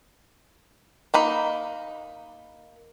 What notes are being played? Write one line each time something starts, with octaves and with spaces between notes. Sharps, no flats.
A#3 D#4 B5